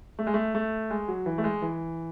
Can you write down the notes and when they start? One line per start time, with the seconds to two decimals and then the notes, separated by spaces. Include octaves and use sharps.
0.19 A3
0.27 G#3
0.34 A3
0.55 A3
0.90 G#3
1.08 F#3
1.26 E3
1.38 A3
1.44 G#3
1.62 E3